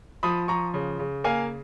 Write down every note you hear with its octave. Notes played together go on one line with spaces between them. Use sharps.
F3 B5 D#6
F3 A#5 C#6
C#3
C#3
A#3 F5 G#5